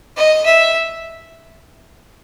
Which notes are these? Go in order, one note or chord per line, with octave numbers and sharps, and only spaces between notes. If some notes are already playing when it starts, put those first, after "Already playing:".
D#5
E5